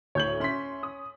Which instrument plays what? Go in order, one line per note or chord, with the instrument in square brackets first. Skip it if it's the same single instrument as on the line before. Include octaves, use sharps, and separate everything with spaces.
[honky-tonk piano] D2 A2 [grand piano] C#5 G6 F#7
[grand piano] C#4 B6 [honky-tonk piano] E5 C6
[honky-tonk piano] D#6